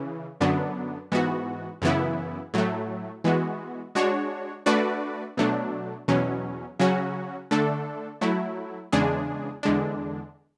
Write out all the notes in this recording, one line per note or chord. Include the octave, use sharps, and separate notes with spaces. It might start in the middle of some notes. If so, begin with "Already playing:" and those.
Already playing: C#3 E3
F#2 D3 F#3 B3 D4
G#2 E3 B3 F#4
F#2 C#3 E3 B3 E4
A2 F#3 A3
E3 G#3 B3 F#4
G#3 D4 F#4 C#5
A3 D4 F#4 B4 D5
B2 F#3 A3 D4
E2 B2 F#3 C#4
C#3 F#3 C#4 F#4
D3 A3 D4 A4
F#3 A3 E4
E2 C#3 G#3 D4 G#4
E2 D3 G#3 D4